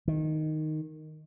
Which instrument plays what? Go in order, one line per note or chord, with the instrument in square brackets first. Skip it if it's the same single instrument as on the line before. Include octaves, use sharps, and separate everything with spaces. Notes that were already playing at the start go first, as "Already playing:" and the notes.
[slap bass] D#3